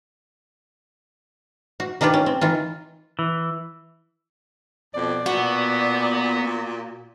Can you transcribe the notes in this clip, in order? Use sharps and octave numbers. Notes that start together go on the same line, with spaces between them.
F#4
D#3 D4 F4 G4 B4
C#4
C4
D#3 E3 F4
E3
F2 B2 D5
A#2 B3 F#4